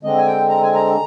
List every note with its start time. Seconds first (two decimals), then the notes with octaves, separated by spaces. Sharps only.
0.03 D3 G#3 C4 D#5
0.17 G#5
0.26 G5
0.49 A#5
0.62 G#5
0.74 A#5